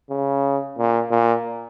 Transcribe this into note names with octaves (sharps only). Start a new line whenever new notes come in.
C#3
A#2
A#2